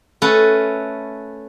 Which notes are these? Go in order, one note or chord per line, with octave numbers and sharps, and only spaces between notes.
A3 C#4 A4 B4